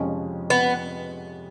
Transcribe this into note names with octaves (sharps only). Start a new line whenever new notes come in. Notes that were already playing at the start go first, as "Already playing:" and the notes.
Already playing: F2 C3 F3 G#3 C#4
B3